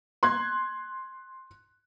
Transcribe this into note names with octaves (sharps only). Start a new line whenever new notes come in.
C6 F#6 G#6